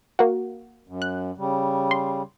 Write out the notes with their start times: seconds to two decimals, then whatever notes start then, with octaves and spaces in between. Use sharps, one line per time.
0.19 A#3 F#4
0.88 F#2
1.02 F#6
1.37 C#3 G3
1.91 C6